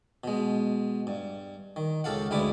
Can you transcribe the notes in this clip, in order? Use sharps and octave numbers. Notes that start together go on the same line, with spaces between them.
B2 G#3
G2
D#3
C#2 G4 A4 F5 F#5
D2 G2 G#3 E4 B4 D6